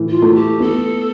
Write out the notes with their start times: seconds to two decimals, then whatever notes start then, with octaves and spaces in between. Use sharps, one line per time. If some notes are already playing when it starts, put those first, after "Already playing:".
Already playing: A2 E3
0.09 F4
0.22 A3
0.35 G4
0.60 B3 A4